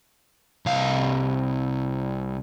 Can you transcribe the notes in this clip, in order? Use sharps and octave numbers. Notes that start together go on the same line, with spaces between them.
C2 F5